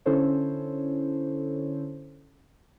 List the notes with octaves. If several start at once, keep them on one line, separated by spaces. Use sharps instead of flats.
D3 C#4 E4 A4 C5 C#5